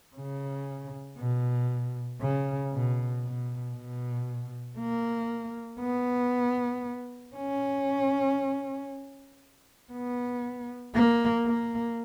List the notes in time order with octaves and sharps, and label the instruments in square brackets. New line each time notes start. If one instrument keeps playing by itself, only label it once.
[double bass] C#3
B2
C#3
B2
B2
B2
A#3
B3
C#4
B3
A#3
A#3